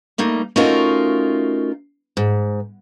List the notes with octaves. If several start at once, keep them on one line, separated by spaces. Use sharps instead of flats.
G3 A3 A#3 D#4
A3 C#4 D#4 F4 F#4 A#4
G#2